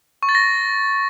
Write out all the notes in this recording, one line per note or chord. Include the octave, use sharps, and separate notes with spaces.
C#6
A6
A#6